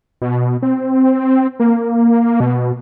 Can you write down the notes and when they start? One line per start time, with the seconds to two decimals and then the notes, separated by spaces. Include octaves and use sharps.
0.22 B2
0.62 C4
1.60 A#3
2.40 B2